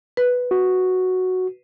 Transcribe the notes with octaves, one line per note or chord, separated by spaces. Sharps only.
B4
F#4